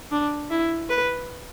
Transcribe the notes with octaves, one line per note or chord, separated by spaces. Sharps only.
D4
E4
B4